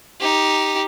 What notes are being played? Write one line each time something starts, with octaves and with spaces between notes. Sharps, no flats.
D#4 G4